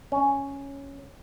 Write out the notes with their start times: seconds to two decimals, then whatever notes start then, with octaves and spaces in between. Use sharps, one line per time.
0.12 C#4